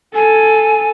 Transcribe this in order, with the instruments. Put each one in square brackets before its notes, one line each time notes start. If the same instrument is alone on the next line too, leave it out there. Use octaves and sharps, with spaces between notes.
[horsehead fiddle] A4 [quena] G#5